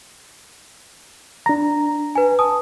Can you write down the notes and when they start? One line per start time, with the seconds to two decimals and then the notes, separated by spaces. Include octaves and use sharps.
1.46 D4 A#5
2.15 B4 G#5
2.39 G#5 A5 D#6